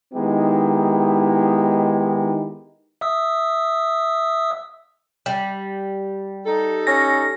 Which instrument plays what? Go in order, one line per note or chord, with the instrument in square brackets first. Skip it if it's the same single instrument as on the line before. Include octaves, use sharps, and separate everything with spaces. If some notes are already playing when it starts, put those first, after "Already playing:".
[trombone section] D#3 G#3 B3 D#4 E4 G4
[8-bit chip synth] E5 D#6 E6
[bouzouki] G3
[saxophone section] D#4 A4
[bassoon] C#4 [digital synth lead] A#6